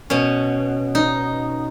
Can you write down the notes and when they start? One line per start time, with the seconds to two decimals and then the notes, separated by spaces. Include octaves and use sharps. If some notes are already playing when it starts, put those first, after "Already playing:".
0.10 B2 C#4
0.95 D#4